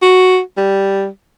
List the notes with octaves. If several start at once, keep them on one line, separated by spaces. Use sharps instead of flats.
F#4
G3